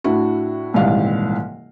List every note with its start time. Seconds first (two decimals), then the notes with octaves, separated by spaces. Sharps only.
0.04 A2 D4 E4 F#4
0.74 D#1 C2 G#2 E3 F5